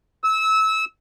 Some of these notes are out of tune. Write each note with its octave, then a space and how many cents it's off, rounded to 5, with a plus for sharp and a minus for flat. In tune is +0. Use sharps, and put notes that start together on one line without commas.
E6 -25